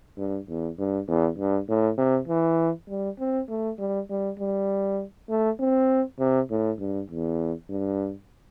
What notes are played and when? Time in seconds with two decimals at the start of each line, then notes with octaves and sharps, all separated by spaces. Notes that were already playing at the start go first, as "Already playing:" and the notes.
0.18 G2
0.48 E2
0.79 G2
1.08 E2
1.39 G2
1.69 A2
1.98 C3
2.28 E3
2.89 G3
3.20 C4
3.49 A3
3.79 G3
4.10 G3
4.40 G3
5.30 A3
5.60 C4
6.20 C3
6.50 A2
6.80 G2
7.11 E2
7.70 G2